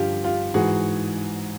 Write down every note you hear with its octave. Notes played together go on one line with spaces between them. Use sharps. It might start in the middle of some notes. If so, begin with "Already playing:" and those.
Already playing: G2 D3 F3 F4 G4
F4 G4
G#2 E3 F#4 G#4